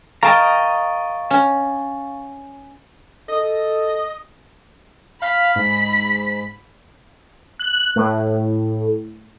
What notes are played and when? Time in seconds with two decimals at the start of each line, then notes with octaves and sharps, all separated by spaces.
0.23 A#4 D#5 F5 G5 A5 A#5 C#6 A6
1.30 C#4
3.29 A4 D#5
5.22 F5 B5 B6
5.56 G#2
7.59 F#6
7.96 A2